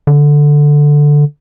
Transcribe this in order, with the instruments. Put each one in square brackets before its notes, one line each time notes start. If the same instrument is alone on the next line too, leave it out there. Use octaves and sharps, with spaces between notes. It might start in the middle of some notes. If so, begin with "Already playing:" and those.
[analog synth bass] D3